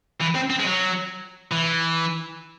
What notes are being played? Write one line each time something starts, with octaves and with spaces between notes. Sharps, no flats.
E3
C4
C4
G#3
F#3
E3